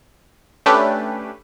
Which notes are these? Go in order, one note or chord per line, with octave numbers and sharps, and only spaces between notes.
A3 C#4 D4 G4 B4